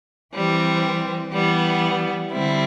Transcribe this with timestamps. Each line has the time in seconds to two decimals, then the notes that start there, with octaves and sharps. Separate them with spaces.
0.34 E3 G3 C4
1.32 E3 G3 B3
2.31 D3 G3 C4 E4